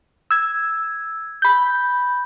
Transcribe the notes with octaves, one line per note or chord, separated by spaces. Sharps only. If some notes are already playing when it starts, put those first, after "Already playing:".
E6 G#6
B5 G6